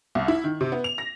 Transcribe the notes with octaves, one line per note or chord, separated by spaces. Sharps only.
C2
E4
D#3
C3
B3
F7
A#6